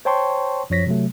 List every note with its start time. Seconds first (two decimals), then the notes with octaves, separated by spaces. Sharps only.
0.05 C5 C#5 G5 A5 C6 C#6
0.70 F#2 F3 C#5 A#6 B6
0.86 C3 F#3 A3